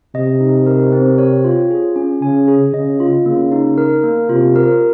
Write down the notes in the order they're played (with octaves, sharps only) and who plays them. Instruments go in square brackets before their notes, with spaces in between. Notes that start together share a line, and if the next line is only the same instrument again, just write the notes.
[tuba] C3 [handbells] D#5
[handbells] D#4
A#4
C4
C#5
F4
G#4
C#4
[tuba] C#3 [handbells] G#5
[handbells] G#4
[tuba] C#3 [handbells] D#5
[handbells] F4
[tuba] C#3 [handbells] A#3
[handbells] D#4
A#4
A#3
[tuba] C3 [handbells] F4
[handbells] A#4